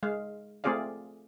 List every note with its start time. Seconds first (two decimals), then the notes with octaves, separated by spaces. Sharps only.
0.03 G#3 F5
0.64 A3 C4 F4 G#4 D5 F5